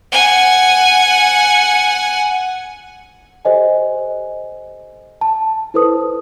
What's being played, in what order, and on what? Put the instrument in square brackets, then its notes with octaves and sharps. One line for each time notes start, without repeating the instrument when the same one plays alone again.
[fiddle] F#5 G#5
[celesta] G4 A4 C5 D#5 G#5
A5
E4 A4 B4 C5 D#6